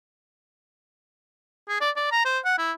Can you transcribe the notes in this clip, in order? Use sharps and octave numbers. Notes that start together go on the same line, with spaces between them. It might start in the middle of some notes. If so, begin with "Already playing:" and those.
G#4
D5
D5
A#5
C5
F#5
E4